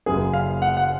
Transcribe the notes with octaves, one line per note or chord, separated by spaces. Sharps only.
F#1 F#2 C#3 G#4
F5
F#5
F#5